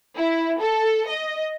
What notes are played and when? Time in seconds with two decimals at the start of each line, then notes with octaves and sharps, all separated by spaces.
0.17 E4
0.61 A4
1.08 D#5